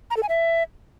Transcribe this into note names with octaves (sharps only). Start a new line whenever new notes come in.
A#5
A4
G#5
E5